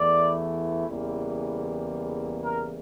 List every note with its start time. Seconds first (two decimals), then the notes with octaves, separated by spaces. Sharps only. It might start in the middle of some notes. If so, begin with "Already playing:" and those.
Already playing: E2 E3 A3 E4 D5
0.88 E2 C#3 E3 G3 A#3
2.44 A#4